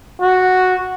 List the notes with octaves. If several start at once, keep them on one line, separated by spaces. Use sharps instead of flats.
F#4